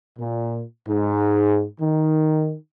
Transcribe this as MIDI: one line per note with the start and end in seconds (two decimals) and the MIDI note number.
0.19 0.62 46
0.87 1.65 44
1.80 2.56 51